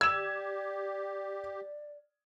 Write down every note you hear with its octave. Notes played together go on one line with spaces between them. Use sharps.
G4 D5 E6 G#6 E7